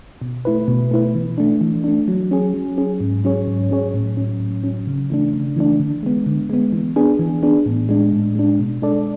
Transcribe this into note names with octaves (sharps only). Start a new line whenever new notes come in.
B2
A3 E4 B4
B2
A3 E4 B4
E3
A3 D4
E3
A3 D4
F#3
C#4 G#4
F#3
C#4 G#4
G#2
F#3 C#4 G#4 C#5
G#2
F#3 C#4 G#4 C#5
A2
F#3 C#4
A2
F#3 C#4
C#3
E3 A3 D4
C#3
E3 A3 D4
D3
G#3 B3
D3
G#3 B3
E3
B3 D4 G#4
E3
B3 D4 G#4
A2
G#3 D4
A2
G#3 D4
B2
G#3 D4 A4 D5